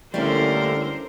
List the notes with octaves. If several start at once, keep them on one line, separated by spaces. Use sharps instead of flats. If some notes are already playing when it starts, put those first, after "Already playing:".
D3 G3 A3 A#3 C#4 E4 A#4 C5